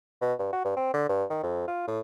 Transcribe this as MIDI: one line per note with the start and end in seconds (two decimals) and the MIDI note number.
0.21 0.33 47
0.39 0.48 43
0.53 0.64 66
0.65 0.74 43
0.77 0.91 60
0.94 1.06 50
1.09 1.24 43
1.30 1.41 51
1.43 1.64 41
1.68 1.86 65
1.88 2.00 45